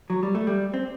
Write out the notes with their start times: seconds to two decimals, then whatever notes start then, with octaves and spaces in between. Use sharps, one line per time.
0.10 F#3
0.23 G3
0.35 A3
0.47 G3
0.74 C4